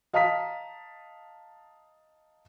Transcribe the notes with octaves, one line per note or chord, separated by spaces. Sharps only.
D#5 F5 A5 A#5 D#6 B6